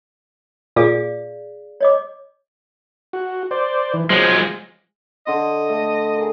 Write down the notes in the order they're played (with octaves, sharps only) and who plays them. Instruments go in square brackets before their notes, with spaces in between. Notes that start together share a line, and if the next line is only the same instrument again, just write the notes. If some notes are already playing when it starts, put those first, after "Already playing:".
[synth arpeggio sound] A#2 D6 [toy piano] G#4 D5 F5
[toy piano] C#5 D#5 D6
[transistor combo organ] F#4
C5 D5
E3
[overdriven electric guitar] F3 G#3 [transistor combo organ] F#3 C5
[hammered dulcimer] D3 C6 [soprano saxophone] D#5
[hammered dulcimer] A3
G#4 A#4